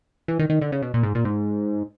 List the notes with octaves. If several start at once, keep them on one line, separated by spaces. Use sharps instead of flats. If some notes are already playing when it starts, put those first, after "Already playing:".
E3
D#3
D#3
D3
C#3
B2
A#2
G#2
A#2
G#2